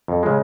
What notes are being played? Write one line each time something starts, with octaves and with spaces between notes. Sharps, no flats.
F2
C#3 G#3